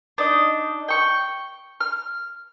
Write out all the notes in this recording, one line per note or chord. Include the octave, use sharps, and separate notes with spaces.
D4 D#4 D#5
G5 C#6
F6